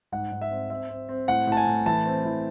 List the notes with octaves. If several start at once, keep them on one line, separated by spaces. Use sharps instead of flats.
G#2 F#5
G#2
E5
C4
C4 E5
C4
C4
A2 F#5
A2
A5
G#5
A2
E3 A5
C4
E3